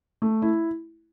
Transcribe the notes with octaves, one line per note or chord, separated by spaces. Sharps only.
A3
E4